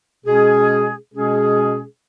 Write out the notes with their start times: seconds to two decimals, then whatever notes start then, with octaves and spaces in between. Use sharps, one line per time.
0.24 B2 G#3 C#4 G#4
1.13 B2 G#3 C#4 G#4